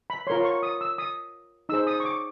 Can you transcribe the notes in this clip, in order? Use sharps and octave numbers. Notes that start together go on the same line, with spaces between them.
B5
F4 A#4 C#5 C6
C#6
D#6
E6
D#6
D#4 G#4 C5 E6
D#6
C#6
D6